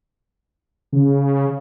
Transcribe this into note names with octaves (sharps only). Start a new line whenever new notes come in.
C#3